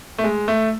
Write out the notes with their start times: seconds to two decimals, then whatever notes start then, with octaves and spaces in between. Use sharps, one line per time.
0.18 A3
0.24 G#3
0.48 A3